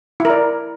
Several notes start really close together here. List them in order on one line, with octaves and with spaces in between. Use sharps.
E4 A#4 D5